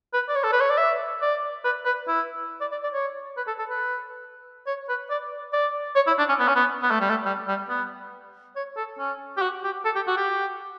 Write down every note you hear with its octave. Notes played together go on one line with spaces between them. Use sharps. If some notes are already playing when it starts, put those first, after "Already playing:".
B4
D5
C#5
A4
B4
C#5
D5
E5
D5
B4
B4
E4
D5
D5
D5
C#5
B4
A4
A4
B4
C#5
B4
D5
D5
C#5
E4
D4
C#4
B3
C#4
B3
B3
A3
G3
A3
G3
G3
B3
C#5
A4
C#4
G4
F#4
G4
A4
G4
F#4
G4